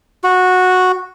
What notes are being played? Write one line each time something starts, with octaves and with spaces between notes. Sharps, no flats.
F#4